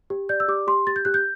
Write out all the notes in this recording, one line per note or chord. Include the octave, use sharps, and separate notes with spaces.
G4
D5 G6
E6
G4 D6
G4 C6
G4 A6
G6
G4 F#6
G6